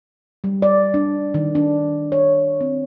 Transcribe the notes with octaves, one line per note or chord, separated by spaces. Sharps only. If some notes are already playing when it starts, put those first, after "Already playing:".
G3
D5
D4
D#3
D4
C#5
C4